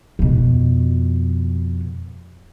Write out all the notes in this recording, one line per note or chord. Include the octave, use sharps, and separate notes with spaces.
F2 B2